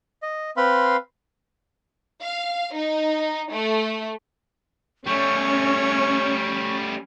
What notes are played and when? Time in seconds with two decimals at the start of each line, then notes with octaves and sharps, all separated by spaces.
0.22 D#5
0.57 C4 B4 F5 B5 C6
2.21 F5
2.73 D#4
3.51 A3
5.06 G3 A3 C#4 C#5 C#6